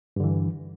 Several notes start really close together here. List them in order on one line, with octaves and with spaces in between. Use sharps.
G2 D3 E3